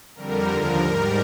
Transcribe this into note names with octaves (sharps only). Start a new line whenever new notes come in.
F2 D3 G3 A#4
D#2 D3 F3 A#4
G#2 G3